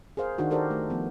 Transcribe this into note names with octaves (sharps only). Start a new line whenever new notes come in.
G#4 A#4 C5 F5
D#3 D4 D#4 F#4
F#4 G4 A4 A#4 C5 D5
A3
F3 B3